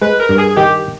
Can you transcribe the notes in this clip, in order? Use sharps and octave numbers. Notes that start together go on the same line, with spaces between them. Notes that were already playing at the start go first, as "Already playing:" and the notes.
G#3 B4
A#4
G2
G#4
D#3 G4